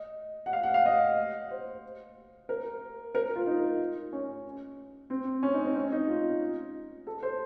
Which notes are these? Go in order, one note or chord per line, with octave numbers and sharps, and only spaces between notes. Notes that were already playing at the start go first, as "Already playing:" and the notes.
Already playing: D#5
F#5
F5
F#5
F5
D#5
C5
A#4
A#4
F4
D#4
C#4
C4
C#4
D#4
C4
C#4
D#4
F4
A4
C5